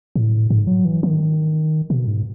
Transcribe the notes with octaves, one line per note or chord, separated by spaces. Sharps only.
A2
G#2
F#3
E3
D#3
B2
G#2